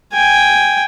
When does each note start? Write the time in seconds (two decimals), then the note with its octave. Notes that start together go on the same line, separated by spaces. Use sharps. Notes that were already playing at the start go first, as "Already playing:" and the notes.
0.13 G5 G#5